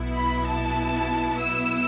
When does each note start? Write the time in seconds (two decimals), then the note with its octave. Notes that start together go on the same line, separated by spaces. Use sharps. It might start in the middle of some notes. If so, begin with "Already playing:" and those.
Already playing: B1 B2 B3 E4
0.16 B5
0.47 A5
1.40 E6